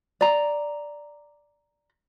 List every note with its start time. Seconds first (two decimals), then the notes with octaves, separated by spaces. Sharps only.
0.21 D5 A#5